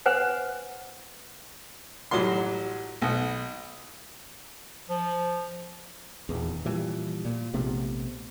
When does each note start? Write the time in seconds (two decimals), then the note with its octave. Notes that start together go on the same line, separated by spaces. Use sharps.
0.06 B4 C5 F#5 G#5
2.11 A1 F#3 G3 F#4 C6
3.02 B1 F#5
4.89 F3
6.29 D#1 E2
6.65 A#2 E3 F3 G3
7.25 A#2
7.53 A#1 C3 A3 B3